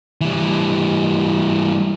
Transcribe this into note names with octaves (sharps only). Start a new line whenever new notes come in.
E3 G3